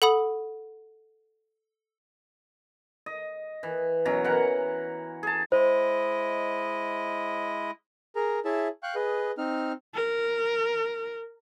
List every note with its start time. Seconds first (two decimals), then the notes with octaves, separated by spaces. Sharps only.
0.02 A4 F#5 B5 D#6
3.06 D#5
3.63 E3
4.05 B2 F#3 C#4 A#5
4.24 E3 A#4 F#5
5.23 G#4 A5
5.52 G#3 E4 C5 D#5
8.16 G#4 A#4 A#5
8.45 E4 G#4 C#5 E5 A5
8.83 F5 G5 C#6 F#6
8.95 G#4 B4 D#5
9.38 C4 D#4 F6
9.95 A#4